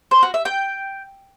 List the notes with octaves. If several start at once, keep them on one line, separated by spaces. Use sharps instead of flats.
C5
F#4
E5
G5